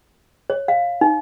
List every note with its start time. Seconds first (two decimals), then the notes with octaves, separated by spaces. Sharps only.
0.50 C#5
0.68 F5
1.01 D#4